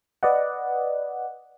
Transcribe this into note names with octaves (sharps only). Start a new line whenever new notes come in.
B4 D5 D#5 F#5